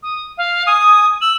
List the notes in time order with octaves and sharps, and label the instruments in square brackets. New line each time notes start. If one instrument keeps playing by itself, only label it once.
[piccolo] D#6
F5
[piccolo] G#5 [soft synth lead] D#6
[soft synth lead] E6 [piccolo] F#7